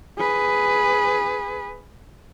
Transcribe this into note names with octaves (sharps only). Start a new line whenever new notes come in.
G#4 B4